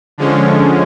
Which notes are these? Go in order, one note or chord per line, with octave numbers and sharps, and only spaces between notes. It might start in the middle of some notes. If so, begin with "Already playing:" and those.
D3 F3 G#3 C#4